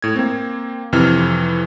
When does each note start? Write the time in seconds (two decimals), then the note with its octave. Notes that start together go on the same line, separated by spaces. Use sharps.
0.02 A2 G#6
0.15 A#3 C4
0.92 F2 C3 E3 F6